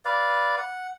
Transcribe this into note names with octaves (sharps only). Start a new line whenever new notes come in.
B4 D5 F5
F#5